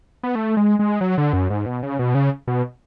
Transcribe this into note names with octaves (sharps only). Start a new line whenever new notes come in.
B3
A3
G#3
G#3
F#3
D3
F#2
G#2
B2
C#3
B2
C#3
B2